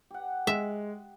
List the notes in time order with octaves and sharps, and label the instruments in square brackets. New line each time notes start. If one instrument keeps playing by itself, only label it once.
[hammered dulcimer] G4 F#5
[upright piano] G#3 [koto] E5